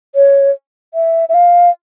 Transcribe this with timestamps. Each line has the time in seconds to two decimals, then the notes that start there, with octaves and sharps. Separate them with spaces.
0.15 C#5
0.94 E5
1.29 E5
1.34 F5